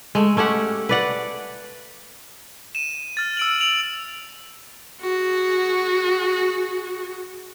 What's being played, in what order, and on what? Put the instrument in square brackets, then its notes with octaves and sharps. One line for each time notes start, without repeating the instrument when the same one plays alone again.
[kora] G#3 A3
A3 C#4 G4 F#5
B4 D5 F#5
[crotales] D#7 E7
F6 A6
E6 D7 F#7
D7 F7 F#7
[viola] F#4 G#4